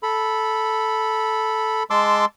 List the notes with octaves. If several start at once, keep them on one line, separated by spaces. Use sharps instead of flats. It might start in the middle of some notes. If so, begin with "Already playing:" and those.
A4 B5
G#3 A5 C6 D6 E6